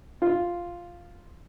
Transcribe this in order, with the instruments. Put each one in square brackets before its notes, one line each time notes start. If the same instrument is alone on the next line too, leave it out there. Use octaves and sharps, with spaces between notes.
[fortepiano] F4